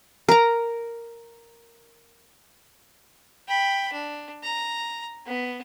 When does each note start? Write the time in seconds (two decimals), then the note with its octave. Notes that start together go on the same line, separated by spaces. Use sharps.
0.28 A#4 A#5
3.48 G5 B5
3.92 D4
4.43 A#5
5.26 B3